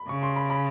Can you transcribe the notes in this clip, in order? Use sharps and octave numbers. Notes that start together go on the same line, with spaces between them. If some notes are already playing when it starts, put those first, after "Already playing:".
Already playing: B5
C#3 C#6
C6
B5
B5